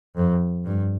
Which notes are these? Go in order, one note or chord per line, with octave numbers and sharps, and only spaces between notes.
F2
G2